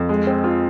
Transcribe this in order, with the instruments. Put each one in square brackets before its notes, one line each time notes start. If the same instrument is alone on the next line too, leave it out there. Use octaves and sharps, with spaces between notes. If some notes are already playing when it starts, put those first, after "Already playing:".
Already playing: [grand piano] F2
G#3
C4
F4